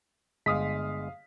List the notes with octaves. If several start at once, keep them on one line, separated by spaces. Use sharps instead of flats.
G1 G#3 F5 D#6 B6